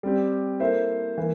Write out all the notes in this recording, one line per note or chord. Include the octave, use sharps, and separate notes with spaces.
G3 C4 G4
A#3 E4 A4 C5 E5
E3 A#3